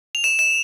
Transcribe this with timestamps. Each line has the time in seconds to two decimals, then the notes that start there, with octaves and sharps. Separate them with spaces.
0.15 F7
0.24 E7
0.39 E7